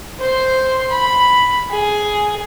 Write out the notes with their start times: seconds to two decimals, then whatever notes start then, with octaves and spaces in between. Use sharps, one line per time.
0.20 C5 C6
0.90 B5
1.71 G#4